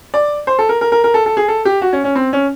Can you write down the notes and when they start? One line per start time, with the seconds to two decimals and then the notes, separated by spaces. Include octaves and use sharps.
0.14 D5
0.47 C5
0.59 A4
0.69 A#4
0.81 A#4
0.92 A#4
1.04 A#4
1.14 A4
1.26 A4
1.37 G#4
1.48 A4
1.65 G4
1.82 F#4
1.93 C#4
2.04 C#4
2.16 C4
2.33 C#4